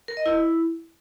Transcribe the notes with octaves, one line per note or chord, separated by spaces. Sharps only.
A#4
D#5
E4